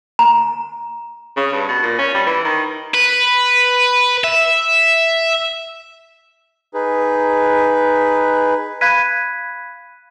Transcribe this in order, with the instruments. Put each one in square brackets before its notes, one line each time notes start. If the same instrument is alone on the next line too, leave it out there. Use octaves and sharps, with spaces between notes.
[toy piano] A#5
[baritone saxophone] C#3
G2
B2
A#2
C#4
G3
E3
D#3
[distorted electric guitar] B4
E5
[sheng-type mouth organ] D#4 G#4 B4
[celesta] F5 B5 F#6 G#6 B6 D#7